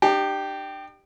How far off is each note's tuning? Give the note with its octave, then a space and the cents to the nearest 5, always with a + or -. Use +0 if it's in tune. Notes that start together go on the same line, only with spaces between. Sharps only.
D4 +45 G4 -5